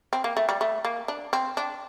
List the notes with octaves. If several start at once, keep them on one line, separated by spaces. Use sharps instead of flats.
C4
A#3
A3
G3
A3
A#3
D4
C4
D4